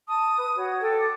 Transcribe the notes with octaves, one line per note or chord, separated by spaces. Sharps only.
A5 D#6
B4
F#4 C#5
A4 G5
D6 D#6